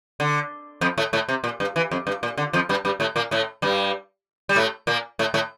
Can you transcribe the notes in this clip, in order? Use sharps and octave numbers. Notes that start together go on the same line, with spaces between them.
D3
F2 F3
A2 A3
A2 A3
C3
A#2
G2
E3
F2
G2
A#2
D3
F2 F3
G2 G3
G2 G3
A2 A3
A#2 A#3
A2 A3
G2 G3
G3
A2 A3
A#2 A#3
A2 A3
A2 A3